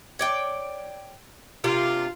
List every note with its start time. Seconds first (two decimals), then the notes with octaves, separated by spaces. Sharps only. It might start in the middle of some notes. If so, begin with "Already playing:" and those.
0.19 C#5 D5 G5
1.64 C3 D4 F4 A#4